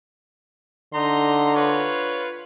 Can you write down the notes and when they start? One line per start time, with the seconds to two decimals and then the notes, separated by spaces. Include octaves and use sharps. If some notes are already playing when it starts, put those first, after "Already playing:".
0.94 D3 D#4 A#5 C6
1.55 F4 B4 C#5